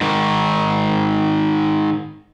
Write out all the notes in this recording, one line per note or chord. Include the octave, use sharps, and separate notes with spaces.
G#2 D#3